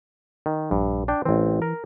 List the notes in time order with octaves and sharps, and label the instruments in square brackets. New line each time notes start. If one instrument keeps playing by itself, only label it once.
[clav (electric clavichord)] D#3
[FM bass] A#1 [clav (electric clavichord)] G2
[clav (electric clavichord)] D4 G5
[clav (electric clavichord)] A1 C4 [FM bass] E3
[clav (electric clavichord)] A#4